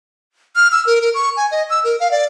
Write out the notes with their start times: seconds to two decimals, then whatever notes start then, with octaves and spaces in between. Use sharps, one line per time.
0.56 F6
0.72 E6
0.86 A#4
1.02 A#4
1.14 C#6
1.37 G#5
1.51 D#5
1.70 E6
1.85 A#4
2.00 F5
2.11 D5